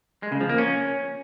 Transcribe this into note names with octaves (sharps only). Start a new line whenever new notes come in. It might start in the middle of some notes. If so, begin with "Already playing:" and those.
G#3
C#3
F3
A#3
C#4